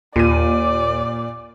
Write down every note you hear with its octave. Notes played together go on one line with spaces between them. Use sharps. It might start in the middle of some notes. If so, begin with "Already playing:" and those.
D#2 A#2 D5 D#7